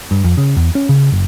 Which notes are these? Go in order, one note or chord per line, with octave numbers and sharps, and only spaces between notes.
G2
F2
C#3
E2
C#4
C#3
F#1